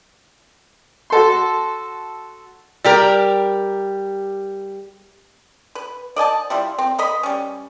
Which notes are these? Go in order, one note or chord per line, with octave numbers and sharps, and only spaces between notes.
F#4 A4 C6
G3 G4 A#4
B4
D5 D#5 G#5 A5
G3 E4 F4
C4
B4 D#5 B5
G3 C#4